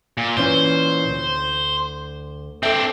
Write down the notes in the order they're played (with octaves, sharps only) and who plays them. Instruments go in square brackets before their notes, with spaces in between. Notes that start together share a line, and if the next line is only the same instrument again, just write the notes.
[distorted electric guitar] A#2
[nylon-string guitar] A#2 E3 C#4 [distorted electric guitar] C5
[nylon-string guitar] D2
[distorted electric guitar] C4 D4 [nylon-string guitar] A4 E5